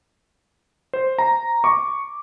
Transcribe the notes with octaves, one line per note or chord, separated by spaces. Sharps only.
C5
A#5
C#6 D6